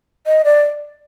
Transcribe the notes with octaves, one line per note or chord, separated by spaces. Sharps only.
D#5
D5